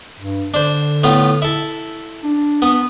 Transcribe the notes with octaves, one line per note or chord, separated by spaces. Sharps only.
G2
D3 D4 C5
A2 B3 F4
E4 A4
D4
B3 D#6